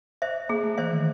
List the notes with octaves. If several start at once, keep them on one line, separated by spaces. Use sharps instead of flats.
C5 E5
A#3 G#4
A3
E3 C5 E5
D#3